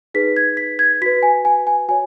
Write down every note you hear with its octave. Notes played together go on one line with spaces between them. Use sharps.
D#4 G#4 B4 B6
G#6
B6
G#6
F#4 B4 B6
G#5
G#5
G#5
F#4 C#5 G#5